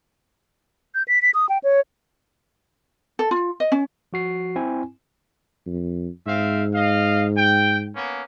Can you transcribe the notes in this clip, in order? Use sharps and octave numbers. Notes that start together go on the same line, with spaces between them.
G6
B6
B6
D#6
G5
C#5
A4
F4
D#5
C#4
F3 F#4 C7
C4 E4 G#5
F2
G#2 C4 E5 F5
D#5 F5
G5
A#3 B3 C#4